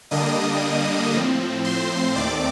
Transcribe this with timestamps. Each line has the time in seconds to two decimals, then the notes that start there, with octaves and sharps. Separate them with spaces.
0.11 D3 G3 A#3 D4 D#5 D#6
1.13 A2 F3 C4
1.64 C5 C6
2.15 D#2 D#3 A3 C4 D5 D6